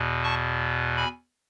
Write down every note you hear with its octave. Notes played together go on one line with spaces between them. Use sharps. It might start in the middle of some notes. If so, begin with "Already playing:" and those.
Already playing: E2 B2
A5 C#6
G#5 B5